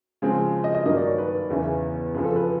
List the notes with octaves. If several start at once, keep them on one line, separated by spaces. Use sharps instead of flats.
C#3 F3 G#3 C4
D#5
D#5
G2 D#3 F#3 A#3 D#5
D5
C#5
B4
E2 C#3 E3
F2 C#3 F3 B4
A4
B4